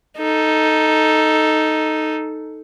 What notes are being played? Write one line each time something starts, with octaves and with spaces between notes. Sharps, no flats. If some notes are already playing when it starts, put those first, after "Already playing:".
D#4 A4